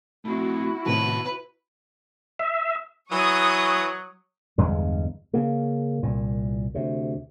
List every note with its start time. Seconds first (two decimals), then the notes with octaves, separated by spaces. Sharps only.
0.25 A3 C4 E4 F#4
0.86 A2 C3 D#3 B3 B4 A5
2.39 E5
3.11 E3 F#3 C#6 D#6
4.58 G1 E2 G#3
5.33 C#3 A#3
6.03 C2 A#2
6.74 D2 C3